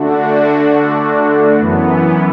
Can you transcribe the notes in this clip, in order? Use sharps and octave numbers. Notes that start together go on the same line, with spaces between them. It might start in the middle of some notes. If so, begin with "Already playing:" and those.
Already playing: D3 A3 D4 F#4
F#2 E3 B3